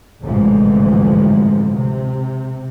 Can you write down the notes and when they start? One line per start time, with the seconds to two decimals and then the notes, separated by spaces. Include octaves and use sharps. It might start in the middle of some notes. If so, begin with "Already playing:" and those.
0.23 A1 D2 G#2 C3 E3 F3
1.74 C3